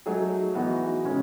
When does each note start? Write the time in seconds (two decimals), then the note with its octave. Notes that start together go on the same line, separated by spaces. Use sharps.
0.06 F#3 A3 D#4 G#4
0.55 E3 B3 D#4 F#4
1.04 C#3 G#3 C#4